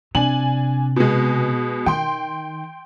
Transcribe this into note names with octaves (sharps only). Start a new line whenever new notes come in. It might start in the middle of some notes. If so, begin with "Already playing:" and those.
C3 D4 G#5 F#7
B2 G#3
D#3 G5 C6